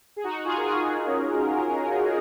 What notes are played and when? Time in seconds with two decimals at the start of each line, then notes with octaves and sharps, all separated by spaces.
0.16 G#4
0.24 D#4 F#4
0.45 F4 G#4
0.58 A#4
0.65 F4 G#4
0.86 D#4 F#4
1.07 C#4